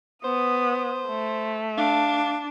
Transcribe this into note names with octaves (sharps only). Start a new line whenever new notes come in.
B3 C5 D#6
A3
D4 F5